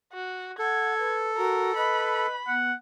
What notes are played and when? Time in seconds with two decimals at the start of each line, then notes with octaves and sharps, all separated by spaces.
0.13 F#4
0.59 A4 F#5 G#6
0.99 B4
1.37 F#4 A#4
1.77 B4 D#5 B5
2.47 B3 F#5